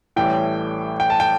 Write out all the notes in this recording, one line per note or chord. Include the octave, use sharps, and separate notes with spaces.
A1 A2 E3 G3 G5
G5
A5
G5